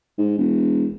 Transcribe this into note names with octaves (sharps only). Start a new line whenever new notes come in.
G#2
E1